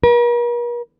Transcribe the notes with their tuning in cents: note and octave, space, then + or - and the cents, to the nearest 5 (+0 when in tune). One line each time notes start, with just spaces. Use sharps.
A#4 +45